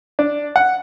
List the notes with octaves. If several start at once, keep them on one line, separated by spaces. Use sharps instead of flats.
D4
F#5